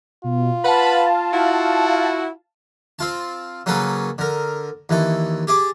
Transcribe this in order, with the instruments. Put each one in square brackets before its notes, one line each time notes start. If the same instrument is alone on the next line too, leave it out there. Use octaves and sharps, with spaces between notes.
[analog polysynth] B2 [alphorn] F4
[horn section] B4 F#5 B5 [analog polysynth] F5 A5
[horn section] E4 F#4
[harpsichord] C4 F4 A5
C#3 F#3 A#3 C#4 A4 B4
D3 A#4
D#2 E3 A4
G4 G#4 D5 D6